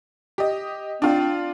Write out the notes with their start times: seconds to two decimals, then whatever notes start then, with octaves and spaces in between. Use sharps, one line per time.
0.38 G4 D#5
1.02 C4 D4 F4